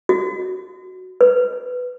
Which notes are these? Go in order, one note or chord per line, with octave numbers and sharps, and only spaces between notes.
F#4
B4